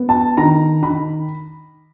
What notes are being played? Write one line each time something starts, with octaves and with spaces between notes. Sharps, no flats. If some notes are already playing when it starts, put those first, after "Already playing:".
Already playing: B3
A5
D#3 A#5
D#3 B5